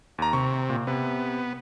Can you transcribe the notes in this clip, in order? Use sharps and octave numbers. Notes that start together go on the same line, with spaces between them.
D#2 A#5
C3 C#6
A#2
C3 B3